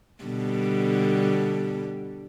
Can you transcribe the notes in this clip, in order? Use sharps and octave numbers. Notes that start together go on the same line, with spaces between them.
B2 D3 G3